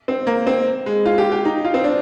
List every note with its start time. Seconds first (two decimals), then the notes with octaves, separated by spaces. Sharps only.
0.08 C4
0.27 A#3
0.47 C4
0.86 G#3
1.05 F4
1.18 G4
1.32 G4
1.45 D#4
1.64 F4
1.74 C4
1.84 D4